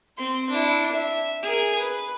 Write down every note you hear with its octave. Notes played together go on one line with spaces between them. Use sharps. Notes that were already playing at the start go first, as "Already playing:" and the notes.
C4 C6
D4 E4
E5
G#4 A#4
B4